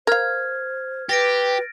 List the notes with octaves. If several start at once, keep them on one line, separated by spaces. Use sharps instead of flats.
A#4 C5 F5 F6 G#6
G4 B4 A6 A#6 D7